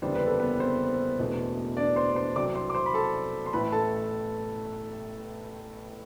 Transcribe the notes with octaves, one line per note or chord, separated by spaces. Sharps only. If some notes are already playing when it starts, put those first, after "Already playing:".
F#1 E2 D3 G3 D4 C5
B4
A4
B3 B4
C4 C5
E1 E2 B2 A3
D4 D5
C5 C6
C5 C6
C2 C3 F#3 D5 D6
C5 C6
D6
C5 C6
B5
A4 A5
C6
A1 A2 E3 A3 B4 B5
A4 A5